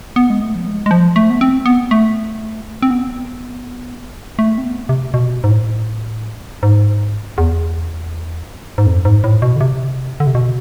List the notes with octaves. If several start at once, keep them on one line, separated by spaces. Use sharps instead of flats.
B3
G#3
A3
F3
G#3
G#3
F3
A3
B3
C4
B3
A3
C4
B3
A3
C4
B3
C3
B2
G#2
A2
G#2
E2
G#2
F2
G#2
A2
B2
D3
C3
D3
C3
B2